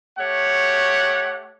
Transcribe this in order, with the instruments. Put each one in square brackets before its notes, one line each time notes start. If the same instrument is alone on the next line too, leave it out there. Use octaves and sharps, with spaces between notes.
[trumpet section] A3 G4 C#5 F#5